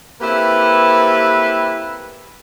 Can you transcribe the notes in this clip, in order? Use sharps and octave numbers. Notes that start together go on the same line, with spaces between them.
A#3 C4 E4 G4 A4 B4